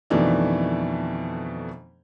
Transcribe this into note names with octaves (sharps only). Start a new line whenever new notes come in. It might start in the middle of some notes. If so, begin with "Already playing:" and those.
F2 B2 D#3 E3 A3 D4